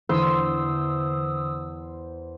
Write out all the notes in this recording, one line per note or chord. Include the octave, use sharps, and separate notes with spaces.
E2 D3 E3 C5 D#6 E6